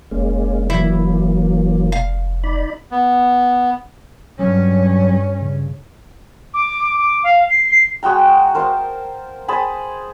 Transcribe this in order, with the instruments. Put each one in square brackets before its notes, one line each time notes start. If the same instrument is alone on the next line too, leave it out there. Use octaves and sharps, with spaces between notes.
[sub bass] F1 [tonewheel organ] G#3 A#3 C#4
[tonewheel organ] E3 F#3 A#3 [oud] E4
[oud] F5
[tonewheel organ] D#4 D5 B5
[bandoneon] B3
[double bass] G2 C#4 [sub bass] F#3
[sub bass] C#3
[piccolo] D6
D6
F5
C7
C7
[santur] G#3 F#4 G5 A#5
A#4 C5 F5 A5
G#4 C5 A5 B5